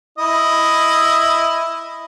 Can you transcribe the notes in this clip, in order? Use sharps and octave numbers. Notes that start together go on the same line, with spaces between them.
E4 D#5